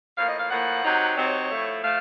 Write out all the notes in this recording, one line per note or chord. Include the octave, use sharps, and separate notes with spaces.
A2 F3 A#3 F5
D#5
F5
A2 F3 A#3 F#5
C3 F#3 C4 D#4
C3 F#3 C4 D#4 C#5
A2 F3 A3
F3 A3 F5